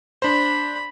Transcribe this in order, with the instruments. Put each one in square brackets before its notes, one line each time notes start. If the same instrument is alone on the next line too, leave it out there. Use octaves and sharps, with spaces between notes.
[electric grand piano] D4 C5 [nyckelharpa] B5